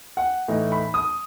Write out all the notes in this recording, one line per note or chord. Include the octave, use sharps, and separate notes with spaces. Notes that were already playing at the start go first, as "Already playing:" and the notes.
F#5
A2 E3 A3 D#4
B5
D#6